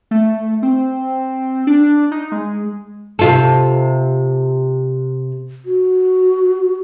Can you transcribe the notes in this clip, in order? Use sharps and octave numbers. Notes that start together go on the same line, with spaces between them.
A3
C4
D4
D#4
G#3
C3 F4 A4
F#4